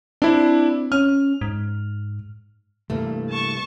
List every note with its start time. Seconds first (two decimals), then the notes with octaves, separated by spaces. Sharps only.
0.22 C4 D4 E4
0.92 C#4 F6
1.41 G#2
2.90 C2 G2 E3 A3 A#3
3.30 A5 C#6